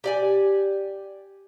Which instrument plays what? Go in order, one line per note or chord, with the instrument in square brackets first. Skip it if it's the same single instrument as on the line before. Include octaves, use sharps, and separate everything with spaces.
[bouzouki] G4 D5 G#5